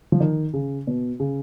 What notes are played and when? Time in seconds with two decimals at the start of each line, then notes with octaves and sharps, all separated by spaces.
0.12 F3
0.20 D#3
0.53 C#3
0.87 B2
1.20 C#3